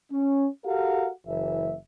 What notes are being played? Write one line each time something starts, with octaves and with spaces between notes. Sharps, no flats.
C#4
F#4 G4 A4 A#4 F5 F#5
F#1 E3 E5